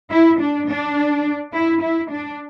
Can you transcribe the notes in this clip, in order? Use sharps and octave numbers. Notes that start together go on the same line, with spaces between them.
E4
D4
D4
E4
E4
D4